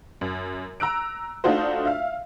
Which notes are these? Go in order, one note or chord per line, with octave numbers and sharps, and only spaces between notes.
F#2
A#5 E6 F#6 D7
A3 D4 D#4 F4 F#4 C5
E5 F5